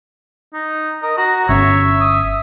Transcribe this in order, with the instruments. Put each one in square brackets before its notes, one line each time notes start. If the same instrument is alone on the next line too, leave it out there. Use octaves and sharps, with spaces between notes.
[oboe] D#4
[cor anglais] A#4 [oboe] D#5
[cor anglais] F#4 [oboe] A#5
[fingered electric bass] G1 C#4 [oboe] C#5 [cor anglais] E5
[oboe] D#6